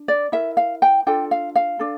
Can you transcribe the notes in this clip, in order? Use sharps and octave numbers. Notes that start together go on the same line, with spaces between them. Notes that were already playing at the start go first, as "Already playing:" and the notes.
Already playing: D4
D5
E4 A#4 E5
F5
G5
D4 F4 A4 G5
F5
F5
D4 A4